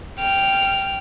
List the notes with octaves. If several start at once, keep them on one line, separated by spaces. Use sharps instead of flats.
G5 F6